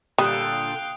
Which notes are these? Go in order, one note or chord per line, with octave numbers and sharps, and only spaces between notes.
A#2 D3 G3 A4 F5 G5 D#6 F#6